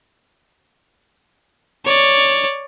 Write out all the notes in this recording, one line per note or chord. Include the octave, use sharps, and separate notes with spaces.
C#5 D5